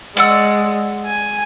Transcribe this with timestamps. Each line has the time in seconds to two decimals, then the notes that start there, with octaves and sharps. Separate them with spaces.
0.17 G#3 D5 F#5 E6
1.06 G#5